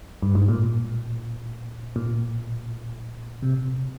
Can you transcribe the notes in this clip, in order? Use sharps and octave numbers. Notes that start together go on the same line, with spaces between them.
G2
G#2
A#2
A#2
C3